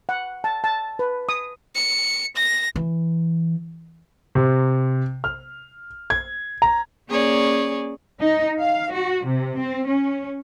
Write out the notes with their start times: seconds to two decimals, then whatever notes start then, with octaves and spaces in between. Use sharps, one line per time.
0.09 F#5
0.44 A5
0.64 A5
0.99 B4
1.29 D#6
1.75 C#7
2.36 A#6
2.76 E3
4.35 C3
5.24 F6
6.10 G#6
6.62 A#5
7.09 A#3 C#4 G#4 C#5 D5
8.20 D#4
8.59 F5
8.92 F#4
9.25 C3
9.57 C4
9.87 C#4